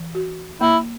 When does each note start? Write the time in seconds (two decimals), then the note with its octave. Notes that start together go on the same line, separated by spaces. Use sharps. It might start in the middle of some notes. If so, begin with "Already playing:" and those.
Already playing: E3
0.15 F#4
0.61 A#3 E4